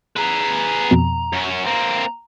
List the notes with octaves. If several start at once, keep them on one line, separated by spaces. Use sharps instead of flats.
G#4 B4 A#5
F2 B2
F#2 C#4
A#3 C4 A#5